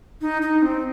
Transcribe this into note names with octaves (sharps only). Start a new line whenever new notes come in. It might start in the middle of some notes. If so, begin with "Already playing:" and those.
D#4
D#4
C4